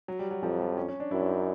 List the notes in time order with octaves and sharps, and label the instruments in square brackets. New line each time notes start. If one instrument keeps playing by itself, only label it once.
[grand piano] F#3
G3
F#3
[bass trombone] F2 [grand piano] F3
[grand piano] G3
C#4
C#4
D4
[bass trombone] F#2 [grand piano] E4
[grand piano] D4
D#4